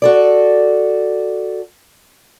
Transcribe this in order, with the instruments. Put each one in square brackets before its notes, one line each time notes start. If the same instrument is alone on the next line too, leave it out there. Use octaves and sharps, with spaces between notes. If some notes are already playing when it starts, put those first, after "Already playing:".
[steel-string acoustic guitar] F#4 A4 D5